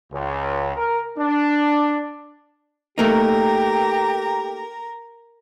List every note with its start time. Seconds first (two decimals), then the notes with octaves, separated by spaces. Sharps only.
0.12 C#2
0.76 A#4
1.18 D4
2.98 A3 A#3 D#4 G4 A#4 A#5